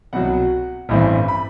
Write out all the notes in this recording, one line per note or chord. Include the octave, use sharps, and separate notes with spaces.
C2 B2 F#3 F#5
A1 G2 E3 A3 C4
B5